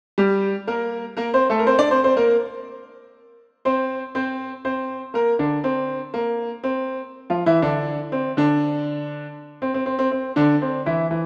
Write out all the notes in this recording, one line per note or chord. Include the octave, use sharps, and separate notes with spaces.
G3 G4
A#3 A#4
A#3 A#4
C4 C5
A3 A4
A#4
C4 C5
D4 D5
C4 C5
C4 C5
A#3 A#4
C4 C5
C4 C5
C4 C5
A#3 A#4
D3 D4
C4
A#3
C4
F3 F4
E3 E4
D3 D4
C4
D3 D4
C4
C4
C4
C4
C4
D3 D4
C4
E3 E4
E3